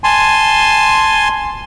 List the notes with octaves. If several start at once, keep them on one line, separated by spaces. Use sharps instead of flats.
G#5 A5 C6